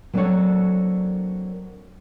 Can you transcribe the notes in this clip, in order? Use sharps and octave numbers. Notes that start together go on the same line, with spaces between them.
F#3 A#3 C4 D4 A4 C#5